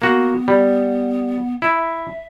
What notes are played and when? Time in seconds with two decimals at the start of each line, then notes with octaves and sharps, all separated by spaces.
0.02 A#3 B3 F#4
0.48 G3
1.62 E4 E5